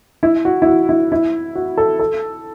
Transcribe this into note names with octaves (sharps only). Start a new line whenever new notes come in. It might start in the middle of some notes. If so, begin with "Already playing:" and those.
E4
F#4
E4
F#4
E4
E4
F#4
A4
A4